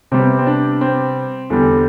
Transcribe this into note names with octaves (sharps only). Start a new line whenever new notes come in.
C3 G3 B3 C4
C4
D4
C4
E2 D3 G3